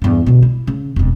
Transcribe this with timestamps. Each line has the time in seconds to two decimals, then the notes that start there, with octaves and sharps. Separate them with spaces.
0.02 E2 G2
0.26 B2 D3
0.42 E4
0.67 C#3
0.96 E1 F2